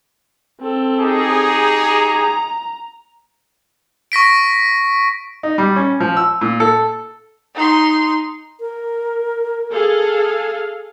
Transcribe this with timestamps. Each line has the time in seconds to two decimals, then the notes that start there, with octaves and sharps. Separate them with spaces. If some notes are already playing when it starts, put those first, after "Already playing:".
0.61 C4 A4
0.99 D#4 G4 G#4
1.33 A#5
4.12 C#6 A#6 B6 D7
5.43 D#4
5.58 G3
5.76 C#4
6.00 F3
6.17 E6
6.41 A#2
6.60 A4
7.55 D#4 C6
8.60 A#4
9.73 G#4 A4 F5